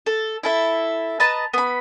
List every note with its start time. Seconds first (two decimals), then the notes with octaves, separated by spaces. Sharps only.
0.06 A4
0.43 E4 A4 E5
1.20 B4 D#5 A5 A#5
1.53 B3 B5